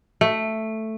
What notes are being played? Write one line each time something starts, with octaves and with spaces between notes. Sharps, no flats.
A3